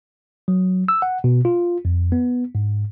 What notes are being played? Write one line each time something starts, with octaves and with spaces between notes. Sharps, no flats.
F#3
E6
F#5
B2
F4
F2
B3
G#2